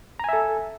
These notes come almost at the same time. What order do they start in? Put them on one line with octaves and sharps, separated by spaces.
A#5 G#5 E5 A4